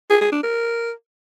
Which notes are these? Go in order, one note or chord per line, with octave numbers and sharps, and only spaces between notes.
G#4
G#4
D4
A#4